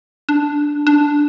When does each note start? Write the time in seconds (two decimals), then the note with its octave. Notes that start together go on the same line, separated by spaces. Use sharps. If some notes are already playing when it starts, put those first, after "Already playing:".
0.29 D4
0.87 D4